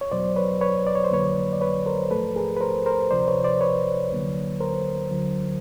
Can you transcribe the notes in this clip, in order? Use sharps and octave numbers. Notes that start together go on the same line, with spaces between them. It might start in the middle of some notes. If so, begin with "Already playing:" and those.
C#5
E2 B2 F#3 C5 D5
B4 C#5
B4 C#5
D5
C#5
C5
F2 D3 F#3 A#3 B4 C#5
D5
B4 C#5
A#4 C5
G#2 F3 A3 A4 B4
G#4 A#4
B4
A#4 C5
A#4 C5
D2 C3 F3 C5 D5
B4 C#5
C5 D5
B4 C#5
D2 D3 F#3 A#3
A#4 C5
D2 D3 F#3